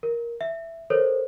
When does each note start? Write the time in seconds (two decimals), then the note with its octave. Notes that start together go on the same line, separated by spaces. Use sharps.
0.03 A#4
0.41 E5
0.90 A4 A#4 C5 C#5